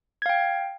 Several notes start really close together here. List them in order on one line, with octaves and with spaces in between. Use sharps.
G#6 F5 G5